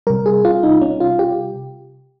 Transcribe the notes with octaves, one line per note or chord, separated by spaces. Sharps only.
C3 G3 A#4
G#4
F4
D#4
C#4
F4
G4